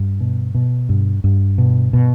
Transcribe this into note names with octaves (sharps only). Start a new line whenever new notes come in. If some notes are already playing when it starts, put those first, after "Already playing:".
Already playing: G2
B2
B2
G2
G2
B2
B2